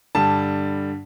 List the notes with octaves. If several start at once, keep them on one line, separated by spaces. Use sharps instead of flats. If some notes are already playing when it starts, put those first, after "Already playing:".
G2 D3 G3 A5